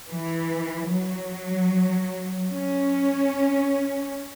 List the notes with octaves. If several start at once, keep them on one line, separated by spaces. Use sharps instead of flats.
E3
F#3
C#4